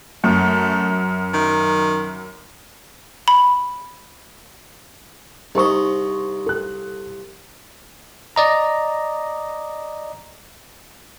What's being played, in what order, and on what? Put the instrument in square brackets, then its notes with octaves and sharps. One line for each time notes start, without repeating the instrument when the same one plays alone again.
[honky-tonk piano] F#2 [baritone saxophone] A3
[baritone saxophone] D#3
[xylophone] B5
[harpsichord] C2 D#5 [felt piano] D#4 C5 C#6
[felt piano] A4 F#6
[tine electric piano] D5 D#5 A#5